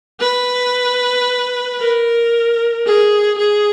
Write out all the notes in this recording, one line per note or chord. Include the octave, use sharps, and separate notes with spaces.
B4
A#4
G#4
G#4